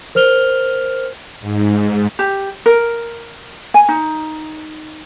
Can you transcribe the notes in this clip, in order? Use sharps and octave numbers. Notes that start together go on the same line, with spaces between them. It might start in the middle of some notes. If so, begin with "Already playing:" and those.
A#4 C5 F6 F7 G7
G#2
G4
A#4
G#5
D#4